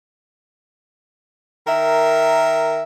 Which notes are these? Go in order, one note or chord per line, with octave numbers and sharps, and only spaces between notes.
D#3 A#4 E5